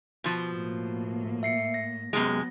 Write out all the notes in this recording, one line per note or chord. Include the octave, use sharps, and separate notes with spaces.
B2 F3
A2 A#3
E5 C7 C#7
A#6
F#2 C3 F#3 G#3 B3 A#6